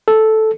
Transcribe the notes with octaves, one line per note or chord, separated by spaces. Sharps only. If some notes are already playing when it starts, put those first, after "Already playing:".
A4